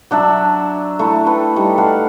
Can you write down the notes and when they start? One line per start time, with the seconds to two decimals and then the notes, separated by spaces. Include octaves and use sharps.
0.11 F#3 D4 E5 A5
0.99 A3 E4
1.26 A4 B4 G5
1.56 G3 A3 D#4
1.78 A4 F5 F#5